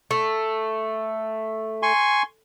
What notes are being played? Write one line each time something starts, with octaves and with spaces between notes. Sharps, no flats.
A3
G#5 C6 C#6